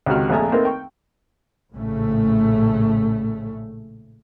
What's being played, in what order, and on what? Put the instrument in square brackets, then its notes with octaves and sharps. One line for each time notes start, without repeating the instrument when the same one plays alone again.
[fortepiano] C#2 C3 D#3 F#4 F6
A#1 F2 A3 G#4 E5 A#5
A3 A#3 C4 D#4 A#4 B4
G5 C#6
[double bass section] A#1 A2 C#3 A3